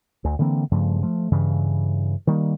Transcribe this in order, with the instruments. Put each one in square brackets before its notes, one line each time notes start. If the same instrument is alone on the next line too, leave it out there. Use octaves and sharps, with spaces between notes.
[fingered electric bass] D2
D3 E3 A#3 C4
G2 C#3 F3 A3
F3 A3
G2 C#3 E3
D#3 G3 A#3